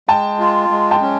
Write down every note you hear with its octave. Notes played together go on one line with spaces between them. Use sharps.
G#3 G5 A5
F4
G#3
G5 A5
C#4